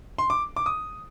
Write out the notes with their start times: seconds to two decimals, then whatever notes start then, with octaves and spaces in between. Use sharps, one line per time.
0.18 C6
0.30 D6
0.56 D6
0.66 D#6